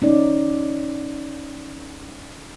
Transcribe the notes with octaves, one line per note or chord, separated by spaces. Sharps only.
C#4 D#4 D5